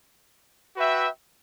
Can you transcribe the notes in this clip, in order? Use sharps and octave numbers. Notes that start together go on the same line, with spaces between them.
F#4 B4 E5 G5